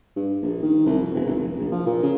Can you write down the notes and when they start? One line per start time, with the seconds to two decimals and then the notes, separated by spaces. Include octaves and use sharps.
0.16 G2
0.42 A#1
0.62 D#3
0.86 C2
1.01 F2
1.14 E1
1.25 G#1
1.40 F1
1.58 A#1
1.72 F3
1.86 A#2
2.02 C#3